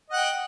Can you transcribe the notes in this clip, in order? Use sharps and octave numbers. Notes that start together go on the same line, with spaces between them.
D#5 F#5 G5